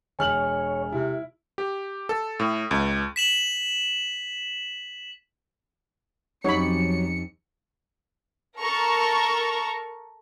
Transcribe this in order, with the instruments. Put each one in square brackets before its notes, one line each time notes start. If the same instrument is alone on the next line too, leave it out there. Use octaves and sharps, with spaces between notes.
[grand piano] E1 F6 F#7 [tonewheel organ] C#5 [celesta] G#5
[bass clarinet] C3 [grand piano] E4
[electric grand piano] G4
A4
A2
C#2
[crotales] B6 E7 F#7
[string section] F2 C#7 [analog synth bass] F#3 [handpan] C#4 D#4 G4 [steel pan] C#5 B5
[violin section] A4 A#4 A#5 C#6